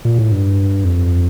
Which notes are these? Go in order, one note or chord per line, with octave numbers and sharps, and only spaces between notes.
A#2
A2
G2
F2